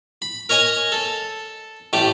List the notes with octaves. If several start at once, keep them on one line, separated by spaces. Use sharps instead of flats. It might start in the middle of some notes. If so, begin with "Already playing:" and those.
B5
A#4 C#5 D#5 G#5
A4
A1 A3 G4 D6